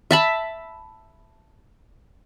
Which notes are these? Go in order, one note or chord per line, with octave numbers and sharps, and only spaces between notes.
E5 A5 B5